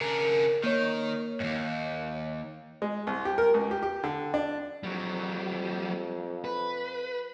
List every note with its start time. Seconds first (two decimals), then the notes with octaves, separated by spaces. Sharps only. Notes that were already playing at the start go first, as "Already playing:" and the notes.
0.01 C#3 D4 A#4
0.63 D#3 A#3 C#5
1.40 D#2 G#2
2.82 G#3
3.07 C2
3.25 G4
3.38 A#4
3.54 C#2
3.71 G4
3.83 G4
4.04 D3
4.34 D4
4.83 F2 F#3 G3
6.44 B4